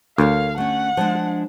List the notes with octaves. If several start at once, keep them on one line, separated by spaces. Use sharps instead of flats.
D2 A4 A#4 C#5 F5
A3 C#4 F#5
F3 G#3 D4